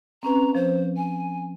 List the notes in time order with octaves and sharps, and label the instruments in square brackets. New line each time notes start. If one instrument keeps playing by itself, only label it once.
[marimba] C4 C#4 B4 [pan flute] A#5
[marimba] F3 [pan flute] C5
[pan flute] G#5